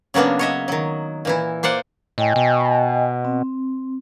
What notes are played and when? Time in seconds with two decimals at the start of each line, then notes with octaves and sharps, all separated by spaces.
0.14 C#3 F#3 A#3 B3 D4
0.39 C#5 D#5 E5
0.68 D#3 F#3
1.25 A#2 E3 E4
1.63 A#3 C5 D5 F#5
2.18 A2 D#5 G5 G#5
2.36 B2
3.25 C4